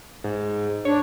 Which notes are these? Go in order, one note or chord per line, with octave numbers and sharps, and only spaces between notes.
G#2
D4 C#5